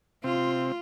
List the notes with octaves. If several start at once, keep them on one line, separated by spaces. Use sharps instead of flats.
C3 C4 F4